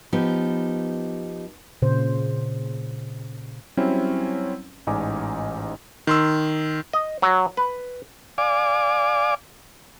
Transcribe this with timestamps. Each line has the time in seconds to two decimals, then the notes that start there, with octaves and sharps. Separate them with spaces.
0.13 F3 B3 D#4 G4
1.82 A#2 C#3 C5
3.77 F#3 G3 C4 C#4 E4
4.87 A1 G#2 D#4 D5 G#5 D6
6.07 D#3 C6 E6
6.93 D#5
7.22 F#3
7.57 B4
8.38 D5 F5 G#5 D6